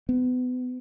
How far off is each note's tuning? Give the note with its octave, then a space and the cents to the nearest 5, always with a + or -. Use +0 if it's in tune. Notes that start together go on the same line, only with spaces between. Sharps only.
B3 +30